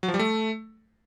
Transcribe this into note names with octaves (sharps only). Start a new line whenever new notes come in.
F#3
F3
G3
A3